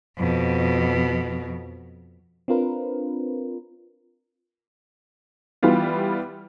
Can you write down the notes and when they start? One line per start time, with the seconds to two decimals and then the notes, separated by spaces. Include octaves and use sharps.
0.18 F2 B2
2.48 C4 D4 F4 A#4 B4
5.63 E3 G3 B3 F4